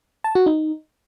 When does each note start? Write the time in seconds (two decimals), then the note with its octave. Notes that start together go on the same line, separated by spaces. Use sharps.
0.24 A5
0.35 F#4
0.46 D#4